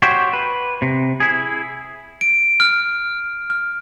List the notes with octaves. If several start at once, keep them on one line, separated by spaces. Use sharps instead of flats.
F#4 G4 C5 C#5 E5
B4
C3
E4 G#4
D7
F6
F6